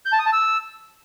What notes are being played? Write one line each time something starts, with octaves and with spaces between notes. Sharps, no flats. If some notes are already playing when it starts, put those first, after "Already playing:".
G6
A5
D#6
A5
E6